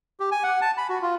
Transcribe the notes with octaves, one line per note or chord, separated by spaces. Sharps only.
G4
G#5
F#5
A5
B5
F#4
F4